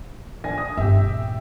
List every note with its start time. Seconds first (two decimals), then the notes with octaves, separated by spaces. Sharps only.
0.44 A#1 G#5 A#6
0.58 D#6
0.77 G1 G4 E5
0.96 A#2